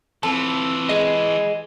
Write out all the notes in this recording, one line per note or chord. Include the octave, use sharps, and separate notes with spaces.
E3 C4 F4 A4
G#4 D#5